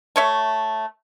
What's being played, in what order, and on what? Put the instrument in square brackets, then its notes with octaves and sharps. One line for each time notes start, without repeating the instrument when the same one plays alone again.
[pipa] A3 C#5 E5